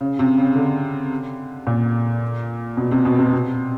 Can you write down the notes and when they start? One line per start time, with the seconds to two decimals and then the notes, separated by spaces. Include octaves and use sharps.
0.01 C#3
0.19 C3
0.37 C#3
0.56 D3
1.67 A#2
2.77 B2
2.91 C3
3.05 B2
3.19 C3
3.33 C3